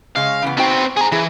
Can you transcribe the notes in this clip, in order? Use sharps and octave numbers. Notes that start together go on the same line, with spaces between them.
C#3 G#3 C#4 F5
C#3 E3 B3
B3 C4 D#4 F#4 G5
G#4 G#5 A#5
E3 E4 G#4